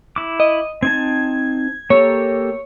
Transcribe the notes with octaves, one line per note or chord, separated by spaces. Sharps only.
E4 D6
D#5
C4 D#4 A5 G#6
A#3 G4 A4 C#5